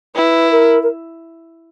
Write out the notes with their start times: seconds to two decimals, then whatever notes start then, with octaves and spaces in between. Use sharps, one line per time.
0.15 E4 B4
0.51 A#4
0.83 A#4